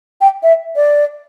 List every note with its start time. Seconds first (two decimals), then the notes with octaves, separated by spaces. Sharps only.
0.21 G5
0.43 E5
0.76 D5